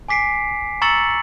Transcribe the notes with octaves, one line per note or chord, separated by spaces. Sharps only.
G#5 D6 B6 C7 D7
A#5 C#6 E6 A6 C#7 F#7